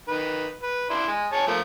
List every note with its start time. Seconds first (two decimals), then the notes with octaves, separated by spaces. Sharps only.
0.08 D#3 B4
0.63 B4
0.90 D4 E4 C6
1.07 G#3
1.32 G#4 C#5 A5
1.47 F3 A3 A#3